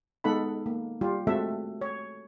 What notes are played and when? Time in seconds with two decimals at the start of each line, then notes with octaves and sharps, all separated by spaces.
0.24 G#3 B3 D#4 A4 F#5 B5
0.66 A#3
1.01 G3 F4 G4
1.27 G#3 A3 C4 F#4 A4 E5
1.81 C#5